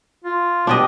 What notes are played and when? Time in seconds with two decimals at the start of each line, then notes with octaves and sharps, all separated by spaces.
0.24 F4
0.67 B2 D4 G4 D#5